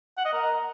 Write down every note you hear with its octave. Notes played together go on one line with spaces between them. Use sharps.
F#5
D#5
A#4